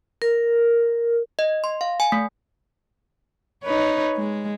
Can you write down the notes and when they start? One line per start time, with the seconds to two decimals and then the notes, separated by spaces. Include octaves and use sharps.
0.22 A#4
1.39 D#5
1.64 C6
1.81 F5
2.00 G#5
2.12 A3
3.64 D#4 B4 C#5
4.16 G#3